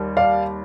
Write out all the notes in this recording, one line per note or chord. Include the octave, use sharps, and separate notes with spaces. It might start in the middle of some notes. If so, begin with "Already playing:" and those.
Already playing: D#2 D#3 G3
D5 F5